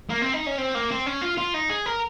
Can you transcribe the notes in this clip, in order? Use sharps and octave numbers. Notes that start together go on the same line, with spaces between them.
A#3
C4
D#4
C#4
C4
A#3
C4
C#4
F4
F4
D#4
G#4
A#4